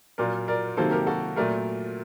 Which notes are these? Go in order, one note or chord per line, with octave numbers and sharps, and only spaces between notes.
A#2 F#3 A#3 A#4 D5
A#4 D5
C3 D#3 F#3 A#3 A4 C5
G4 A#4
F#4 A4
A#2 F#3 A3 A#4 D5